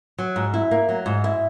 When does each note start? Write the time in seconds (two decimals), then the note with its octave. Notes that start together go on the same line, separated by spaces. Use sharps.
0.18 F#3
0.36 G#2
0.54 E4
0.71 A#3
0.89 F#3
1.06 G#2
1.24 E4